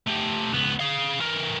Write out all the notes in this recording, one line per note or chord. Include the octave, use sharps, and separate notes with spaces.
A3 G4
C#2 B3
G#4 F5
E3 A#4